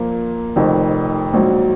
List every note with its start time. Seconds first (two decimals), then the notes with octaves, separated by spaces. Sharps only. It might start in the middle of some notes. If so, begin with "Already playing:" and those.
Already playing: A#2 F3 A#3
0.56 F1 F2 D#3
1.34 A#1 G#2 F#3